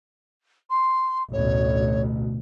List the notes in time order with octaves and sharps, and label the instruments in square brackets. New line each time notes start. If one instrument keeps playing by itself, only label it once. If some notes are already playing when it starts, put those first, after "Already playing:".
[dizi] C6
[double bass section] A1 D2 B2 [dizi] C#5